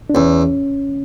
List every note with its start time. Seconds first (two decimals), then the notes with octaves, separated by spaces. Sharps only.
0.10 D4
0.14 E2 C#4